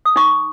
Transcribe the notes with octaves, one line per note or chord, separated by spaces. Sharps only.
D#6
D#4 C#6